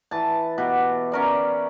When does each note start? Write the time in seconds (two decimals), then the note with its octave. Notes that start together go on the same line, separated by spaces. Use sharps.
0.11 E3 A5
0.58 B2 G4
1.12 C#4 A#4 D5